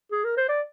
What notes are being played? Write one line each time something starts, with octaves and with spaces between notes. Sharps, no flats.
G#4
A#4
C5
D5